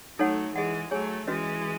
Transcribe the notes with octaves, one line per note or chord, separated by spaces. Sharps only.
F#3 A3 D#4 A4 C#5 F#5
E3 G#3 G#4 D#5 F#5
F#3 A3 G#4 C#5 G#5
E3 G#3 C#4 F#4 B4 D#5